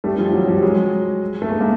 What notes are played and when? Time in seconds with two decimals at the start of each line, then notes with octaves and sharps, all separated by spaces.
0.04 G3 A3
0.18 F3 G3
0.33 E3 F#3
0.48 F3 G3
0.62 F#3 G#3
1.42 A3
1.50 G#3 A#3
1.60 G#3 A#3